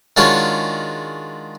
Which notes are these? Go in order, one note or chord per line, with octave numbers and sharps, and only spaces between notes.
D#3 G#3 D4 F4 F#4 C#5